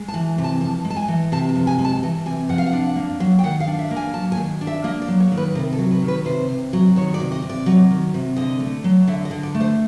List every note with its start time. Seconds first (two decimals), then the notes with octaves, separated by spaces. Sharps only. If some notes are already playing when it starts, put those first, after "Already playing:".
Already playing: G#3
0.08 A5
0.14 E3
0.38 C3
0.44 A5
0.61 F2 A5
0.85 G#3
0.90 A5
0.96 G#5
1.08 E3
1.32 C3 A5
1.49 A5
1.56 F2
1.67 G#5
1.79 G#3
1.85 A5
2.03 E3
2.26 C3 G#5
2.49 F2 F#5
2.58 F5
2.66 F#5
2.73 D4
2.96 A#3
3.20 F#3
3.39 G5
3.43 D#3 F#5
3.60 F5
3.68 D4
3.79 E5
3.91 A#3
3.96 G#5
4.14 F#3 A5
4.32 G#5
4.37 D#3
4.61 D4
4.67 E5
4.84 A#3 D#5
5.02 D5
5.08 F#3
5.20 C#5
5.32 D#3
5.37 B4
5.55 C3 A#4
5.73 A4
5.78 F#3
5.91 B4
6.03 D#3
6.08 B4
6.25 C3 C5
6.48 C3
6.73 F#3
6.96 D#3 C#5
7.14 D5
7.20 C3
7.32 D#5
7.42 C3
7.50 D5
7.66 F#3
7.91 D#3
8.14 C3
8.36 D3 D#5
8.60 A3
8.84 F#3
9.07 D3 E5
9.25 D#5
9.31 D3
9.43 D5
9.54 A3
9.61 C5